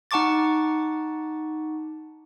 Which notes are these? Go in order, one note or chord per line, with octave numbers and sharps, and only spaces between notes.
D#4 F#5 A5 C#6 D6 A6